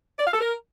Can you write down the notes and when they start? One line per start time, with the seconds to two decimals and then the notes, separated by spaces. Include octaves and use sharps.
0.19 D5
0.27 F5
0.34 A4
0.41 A#4